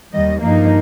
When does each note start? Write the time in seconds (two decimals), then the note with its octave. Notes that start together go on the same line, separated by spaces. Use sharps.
0.13 D#2 D#3 G3 D#5
0.41 G2 F3 A#3 D#4